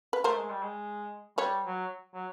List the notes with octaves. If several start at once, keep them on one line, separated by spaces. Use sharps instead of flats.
B4
A3 A#4 C5
G#3
G3
G#3
G3 B4 C#5
F#3
F#3